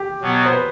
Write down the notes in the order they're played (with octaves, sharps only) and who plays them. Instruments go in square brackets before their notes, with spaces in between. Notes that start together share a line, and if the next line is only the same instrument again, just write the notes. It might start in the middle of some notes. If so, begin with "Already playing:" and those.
Already playing: [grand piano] G4
[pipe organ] B2 F#3 B3
[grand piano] C5
B4